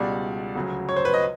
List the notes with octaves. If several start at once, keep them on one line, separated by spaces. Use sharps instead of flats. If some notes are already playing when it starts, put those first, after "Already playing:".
Already playing: C#2 B2 G3 D5
D2 C#3 F#3
C#5
C5
B4
D#5